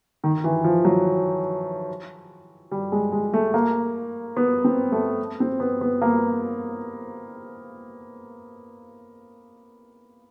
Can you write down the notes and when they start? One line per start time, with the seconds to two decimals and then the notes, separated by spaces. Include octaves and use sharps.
0.24 D#3
0.44 E3
0.64 F3
0.85 F#3
2.71 G3
2.92 G#3
3.12 G#3
3.34 A3
3.54 A#3
4.37 B3
4.65 C4
4.92 A3
5.40 C4
5.60 B3
5.81 B3
6.02 A#3